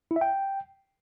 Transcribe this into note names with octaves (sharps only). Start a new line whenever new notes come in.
E4
E5
G5